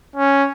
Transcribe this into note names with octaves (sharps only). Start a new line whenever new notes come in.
C#4